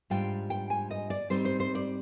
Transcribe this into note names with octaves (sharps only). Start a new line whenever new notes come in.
G#2 G3 D4 F4 G5
G5
G#5
D#5
D5
G#2 G3 C4 D#4 C5
C5
C5
D5